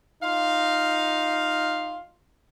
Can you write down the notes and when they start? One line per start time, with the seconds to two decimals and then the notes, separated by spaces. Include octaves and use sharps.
0.23 D#4 F4 F5